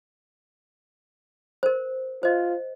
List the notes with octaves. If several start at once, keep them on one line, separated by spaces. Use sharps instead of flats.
A#4 C5
F4 C5 D#5